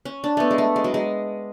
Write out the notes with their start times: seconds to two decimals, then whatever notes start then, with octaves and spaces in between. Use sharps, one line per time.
0.05 C#4
0.24 D4
0.37 A3 B3
0.51 G#3
0.58 A3
0.76 G#3
0.84 F#3
0.94 G#3